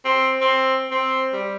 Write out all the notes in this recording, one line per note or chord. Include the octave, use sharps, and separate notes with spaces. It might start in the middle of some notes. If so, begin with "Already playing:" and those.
C4
C4
C4
G3